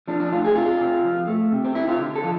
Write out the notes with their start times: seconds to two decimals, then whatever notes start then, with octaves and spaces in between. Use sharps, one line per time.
0.08 F3 D4
0.20 D4
0.32 A3 F4
0.45 G#4
0.56 C3 F4
0.81 C3
1.04 F3
1.27 A3
1.52 C3
1.64 C4
1.75 C3 E4
1.88 F4
1.99 D3
2.16 A4
2.24 F3